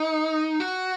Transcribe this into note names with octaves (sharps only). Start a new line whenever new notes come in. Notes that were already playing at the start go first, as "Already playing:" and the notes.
Already playing: D#4
F#4